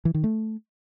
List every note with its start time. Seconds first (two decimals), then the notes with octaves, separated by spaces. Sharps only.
0.05 E3
0.14 D#3
0.24 A3